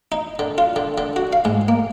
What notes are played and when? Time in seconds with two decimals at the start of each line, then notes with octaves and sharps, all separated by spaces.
0.12 D#4
0.39 D3
0.58 F4
0.76 D3
0.98 D3
1.16 F#4
1.33 F5
1.45 G#2
1.68 A#3